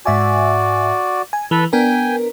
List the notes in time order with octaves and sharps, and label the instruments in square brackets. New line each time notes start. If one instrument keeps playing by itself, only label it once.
[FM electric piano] G#2 E5 G#5 [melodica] F#4 D5
[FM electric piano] G#5
[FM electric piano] E3 [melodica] A4 B4
[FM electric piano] B3 D4 A#4 [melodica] G5 G#5